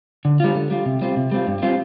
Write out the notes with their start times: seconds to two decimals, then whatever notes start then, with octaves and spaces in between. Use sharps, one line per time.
0.25 D3
0.40 G3 F4
0.55 D3
0.71 G3 F4
0.86 C3
1.02 G3 C4 F4
1.17 C3
1.32 G3 C4 F4
1.47 G2
1.62 G3 C4 F4